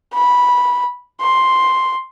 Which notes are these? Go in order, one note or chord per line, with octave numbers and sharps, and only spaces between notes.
B5
C6